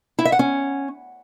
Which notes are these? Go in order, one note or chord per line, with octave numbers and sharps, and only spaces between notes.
E4
E5
F#5
C#4